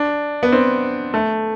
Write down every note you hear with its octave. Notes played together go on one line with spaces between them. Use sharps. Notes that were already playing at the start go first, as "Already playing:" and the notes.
Already playing: D4
B3
C4
A3